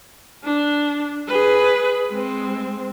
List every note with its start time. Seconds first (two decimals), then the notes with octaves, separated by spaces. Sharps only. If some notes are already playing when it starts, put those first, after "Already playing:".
0.44 D4
1.28 G#4 B4
2.09 G#3 C4